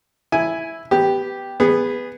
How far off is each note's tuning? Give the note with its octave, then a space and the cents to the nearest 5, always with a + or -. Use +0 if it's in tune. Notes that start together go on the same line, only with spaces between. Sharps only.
E4 +0 G#5 +0
B3 +0 G4 +0
B3 +0 G#4 -20